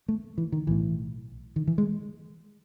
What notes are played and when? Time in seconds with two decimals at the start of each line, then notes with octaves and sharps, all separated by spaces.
0.08 A3
0.38 E3
0.52 D#3
0.67 B1 A2 E3
1.56 D#3
1.67 E3
1.78 G#3